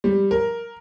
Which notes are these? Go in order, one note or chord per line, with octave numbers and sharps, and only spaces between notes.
G3
A#4